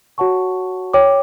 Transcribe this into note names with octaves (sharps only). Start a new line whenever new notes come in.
F#4 C#5 F#5 A5 C#6
C#5 G5 D6